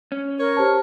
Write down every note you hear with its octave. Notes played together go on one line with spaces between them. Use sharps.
C#4
A#4 C#5
G4 C5 A5